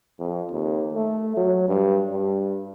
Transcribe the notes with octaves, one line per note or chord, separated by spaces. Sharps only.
F2
D#2
A3
F#3
G2
G2